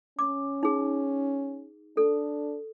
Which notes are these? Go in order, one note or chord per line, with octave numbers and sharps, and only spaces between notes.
C#4 D6
D#4 G#4
D4 A4